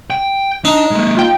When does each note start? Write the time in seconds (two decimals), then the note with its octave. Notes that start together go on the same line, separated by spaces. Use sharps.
0.10 G5
0.65 D4 D#4
0.91 G#3 A#3
1.17 F4 G5